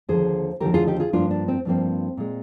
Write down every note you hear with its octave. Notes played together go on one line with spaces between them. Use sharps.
D#2 D3 F3 G#4 C5
D#2 D3 F3 G4 A#4
F4 G#4
D#4 G4
F4 G#4
G2 F3 A#3 D4 F4
D4
C4
G2 F3 A#3 C4
A#2 G#3